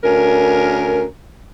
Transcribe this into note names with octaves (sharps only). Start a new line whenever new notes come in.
D2 C#4 A#4